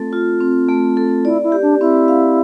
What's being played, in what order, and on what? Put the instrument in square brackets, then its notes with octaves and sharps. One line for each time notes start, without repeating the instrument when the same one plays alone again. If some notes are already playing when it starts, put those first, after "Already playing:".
Already playing: [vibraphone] A3 C4 F4 A4
F4
C4
A3
A4
[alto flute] E4 [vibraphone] D5
[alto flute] E4
[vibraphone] G4
[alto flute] D4
[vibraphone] C4 [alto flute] E4
[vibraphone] F5